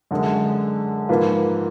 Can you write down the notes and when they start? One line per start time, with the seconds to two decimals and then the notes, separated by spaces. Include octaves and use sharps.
0.11 F#2 D3 G#3
1.09 G#2 F3 A#3 F4 B4